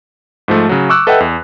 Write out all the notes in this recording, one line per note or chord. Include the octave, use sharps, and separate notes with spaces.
G#2 F3 A3
C#3 F#3
C#6 D6 E6 F#6
A4 B4 D#5 E5 F#5 G5
E2